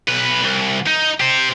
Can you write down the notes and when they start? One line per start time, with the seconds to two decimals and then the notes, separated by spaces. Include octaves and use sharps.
0.08 B1 B4
0.43 C2
0.87 D#4
1.20 G4 C5